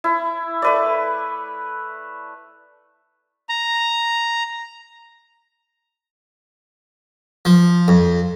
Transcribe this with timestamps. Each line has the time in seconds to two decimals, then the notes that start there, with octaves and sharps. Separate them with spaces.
0.04 E4
0.62 A3 B4 D5
3.49 A#5
7.45 F3
7.88 F2